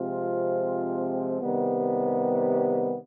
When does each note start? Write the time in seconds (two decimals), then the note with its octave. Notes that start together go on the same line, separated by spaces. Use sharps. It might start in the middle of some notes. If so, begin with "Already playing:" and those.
Already playing: C3 F3 G#3 C4 F4
1.41 C3 D#3 G3 B3